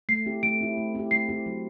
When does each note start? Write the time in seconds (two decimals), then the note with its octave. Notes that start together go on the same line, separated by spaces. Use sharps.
0.09 A3 C7
0.26 C4 E4 G4
0.43 A3 D7
0.60 C4 E4 G4
0.78 A3
0.95 C4 E4 G4
1.11 A3 C7
1.29 C4 E4 G4
1.46 F#3